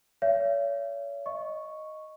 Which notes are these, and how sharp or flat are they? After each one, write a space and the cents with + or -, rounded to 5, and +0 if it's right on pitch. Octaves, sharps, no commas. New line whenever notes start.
C#5 +35 E5 +45
D#5 +0 C#6 +0